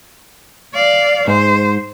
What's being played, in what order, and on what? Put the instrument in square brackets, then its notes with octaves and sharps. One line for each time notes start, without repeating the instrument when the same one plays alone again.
[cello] D5 F5
[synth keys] G#2 [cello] C5